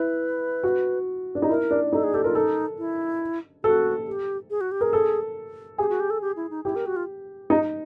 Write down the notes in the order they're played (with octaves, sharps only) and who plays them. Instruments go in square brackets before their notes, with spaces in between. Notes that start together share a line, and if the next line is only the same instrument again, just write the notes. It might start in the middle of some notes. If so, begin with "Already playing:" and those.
Already playing: [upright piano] E4 [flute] B4
[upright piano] F#4
D4
D#4
[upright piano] E4 [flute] A#4
[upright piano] D4
[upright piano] D#4 [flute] A4
[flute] G#4
[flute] G4 [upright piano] A4
[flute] F4 [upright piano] A#4
[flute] D#4 [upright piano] A4
[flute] E4
[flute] F#4 [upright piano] A4
[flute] G4
G#4
F#4
G4
[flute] G#4 [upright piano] A#4
[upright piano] A4
[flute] G4 [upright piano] G#4
[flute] F#4
G4
A4
G4
E4
D#4
[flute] E4 [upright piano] G4
[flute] A#4
F#4
F4
[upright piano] D#4